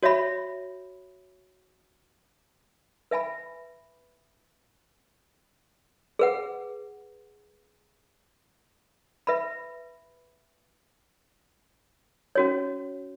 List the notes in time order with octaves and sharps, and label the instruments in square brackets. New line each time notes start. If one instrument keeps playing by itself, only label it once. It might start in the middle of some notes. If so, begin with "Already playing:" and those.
[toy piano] F#4 C#5 E5 B5
B4 E5 G#5 B5
G#4 B4 F#5
B4 E5 B5
C#4 F#4 C#5